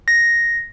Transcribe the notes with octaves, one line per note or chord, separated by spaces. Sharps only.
A#6